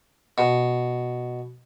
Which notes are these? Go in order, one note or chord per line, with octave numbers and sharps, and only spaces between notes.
B2